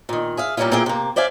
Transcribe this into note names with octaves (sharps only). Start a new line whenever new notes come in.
A#2 D#3
G#4 E5 F5
A#2 G3 A#3 C#4 E4 F4
A#2 A#3 C4 E4 G#4 G5
C3 A#3
C5 D5 E5 F5 G#5